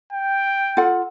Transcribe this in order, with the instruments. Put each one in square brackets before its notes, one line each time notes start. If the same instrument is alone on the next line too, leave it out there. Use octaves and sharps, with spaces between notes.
[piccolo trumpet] G5
[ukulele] F4 A4 F#5